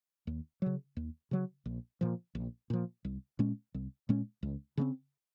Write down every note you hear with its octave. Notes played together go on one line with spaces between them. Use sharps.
D#2
C#3 F#3
D#2
C#3 F#3
A#1
A#2 F3
A#1
A#2 F3
C2
A#2 G#3 C#4
C2
A#2 G#3 C#4
C#2
C#3 G#3 C4